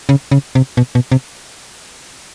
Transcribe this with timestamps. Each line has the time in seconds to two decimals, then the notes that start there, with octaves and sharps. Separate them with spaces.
0.09 C#3
0.31 C#3
0.55 C3
0.77 B2
0.95 B2
1.12 C3